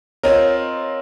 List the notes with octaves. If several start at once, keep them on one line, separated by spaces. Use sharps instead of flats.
C4 F4 A#4 C#5 D#5